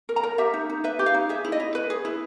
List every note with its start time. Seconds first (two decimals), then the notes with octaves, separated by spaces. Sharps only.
0.09 A#4
0.16 A#5
0.23 A#4
0.38 G4 E5
0.54 D#4
0.70 D#4
0.84 B4 E5
0.99 G4
1.06 F5
1.14 D#4
1.29 G#4 E5
1.45 E4
1.52 D#5
1.60 E4
1.75 B4
1.90 G#4
2.05 E4